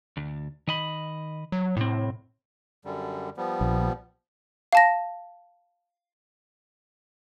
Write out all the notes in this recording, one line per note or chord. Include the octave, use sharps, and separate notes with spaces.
D2
D#3 D#5 B5
F#3
C2 A2 C4
F#2 D3 G3
F3 G3 B3
A#1
F5 A5 A#6